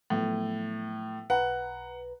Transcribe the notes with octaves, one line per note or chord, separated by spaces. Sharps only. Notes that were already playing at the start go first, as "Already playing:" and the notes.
A2 F3 F#3 B3
B1 B4 F#5 A#5